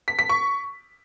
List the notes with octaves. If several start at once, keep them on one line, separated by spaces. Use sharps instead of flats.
B6
B6
C#6